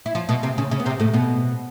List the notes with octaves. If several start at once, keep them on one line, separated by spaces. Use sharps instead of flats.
E4
F3 F4
B2 B3
C3 C4
C#3 C#4
C#3 C#4
B3
C3 C4
A2 A3
B2 B3